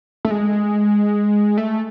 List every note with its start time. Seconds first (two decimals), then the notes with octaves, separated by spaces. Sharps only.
0.25 A3
0.31 G#3
1.58 A3